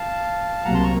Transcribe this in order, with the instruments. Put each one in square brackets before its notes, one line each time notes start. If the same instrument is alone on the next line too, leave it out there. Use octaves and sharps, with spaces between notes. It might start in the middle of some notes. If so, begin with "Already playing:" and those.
Already playing: [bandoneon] F5 A5
[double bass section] C2 C3 F#3 A#3 [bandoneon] F#5 A#5
[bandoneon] A5 C6
A#5 C#6